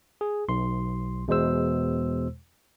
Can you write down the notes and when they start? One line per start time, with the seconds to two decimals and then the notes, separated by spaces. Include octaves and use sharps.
0.21 G#4
0.48 B1 C6
1.28 E2 B2 G#3 C5 E6